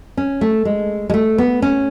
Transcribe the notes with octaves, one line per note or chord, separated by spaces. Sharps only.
C#4
A3
G#3
G#3
A3
B3
C#4